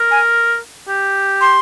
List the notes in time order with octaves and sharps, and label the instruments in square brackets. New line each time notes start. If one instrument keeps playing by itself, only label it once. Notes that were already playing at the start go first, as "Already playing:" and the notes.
Already playing: [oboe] A#4
[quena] G#5
[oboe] G4
[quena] C6